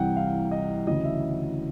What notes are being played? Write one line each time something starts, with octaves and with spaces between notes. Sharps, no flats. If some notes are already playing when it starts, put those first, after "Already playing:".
Already playing: C2 C3 E3 F#5 G5
F5
D#5
D2 C#3 E3 D#5
E5